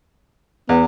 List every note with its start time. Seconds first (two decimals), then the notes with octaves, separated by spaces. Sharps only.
0.69 E2 B3